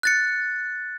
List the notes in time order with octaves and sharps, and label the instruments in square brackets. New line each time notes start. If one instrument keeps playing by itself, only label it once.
[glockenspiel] F#6 A6 C#7